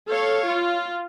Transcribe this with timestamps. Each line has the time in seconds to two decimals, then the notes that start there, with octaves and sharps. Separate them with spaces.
0.10 A4 C#5 F5
0.46 F4